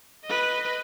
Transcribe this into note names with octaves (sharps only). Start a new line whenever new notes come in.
B4 D#5